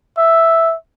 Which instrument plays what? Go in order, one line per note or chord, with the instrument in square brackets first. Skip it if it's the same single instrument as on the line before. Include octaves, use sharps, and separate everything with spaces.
[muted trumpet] E5